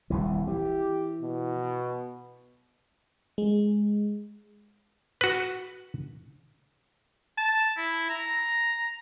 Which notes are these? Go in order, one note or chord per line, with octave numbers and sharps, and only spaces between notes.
D#1 C2 E3
E3 G4
B2
G#3
F#4 B4
A5
E4
A#5